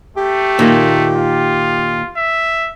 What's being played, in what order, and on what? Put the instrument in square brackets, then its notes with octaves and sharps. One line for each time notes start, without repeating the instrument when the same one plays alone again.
[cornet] A3 [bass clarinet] G4
[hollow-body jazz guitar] A#2 D#3 A#3
[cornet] F4
E5